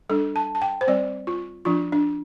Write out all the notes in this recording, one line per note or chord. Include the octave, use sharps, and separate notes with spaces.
G3 D4 A4
A5
A5
G5
C5
G3 C4 D5
F4
F3 D4 F4
D4